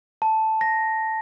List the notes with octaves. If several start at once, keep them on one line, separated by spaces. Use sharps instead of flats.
A5
A#6